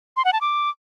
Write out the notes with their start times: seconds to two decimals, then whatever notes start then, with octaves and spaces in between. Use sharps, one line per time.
0.17 C6
0.25 F#5
0.33 A5
0.41 D6